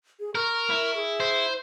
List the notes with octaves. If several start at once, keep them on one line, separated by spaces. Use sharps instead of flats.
G#4
A#4 C#6
E4
G#4
C5